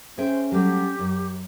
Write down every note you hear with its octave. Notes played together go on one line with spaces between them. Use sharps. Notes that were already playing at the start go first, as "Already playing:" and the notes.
C#4 G#4 C5 E5 G5
F#3 G3 A3 G4
F#2